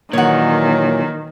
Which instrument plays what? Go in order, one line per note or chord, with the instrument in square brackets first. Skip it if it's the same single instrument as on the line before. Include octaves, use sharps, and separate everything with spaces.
[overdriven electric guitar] A#2 [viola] D#3 [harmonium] E3 F#3 [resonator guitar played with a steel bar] C#5 F#5